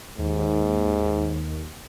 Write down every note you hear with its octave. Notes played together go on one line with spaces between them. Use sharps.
D#2 G#2